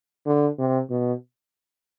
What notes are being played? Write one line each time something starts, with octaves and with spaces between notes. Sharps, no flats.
D3
C3
B2